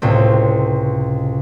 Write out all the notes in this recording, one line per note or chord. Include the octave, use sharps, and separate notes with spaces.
C#2 A2 C3 C4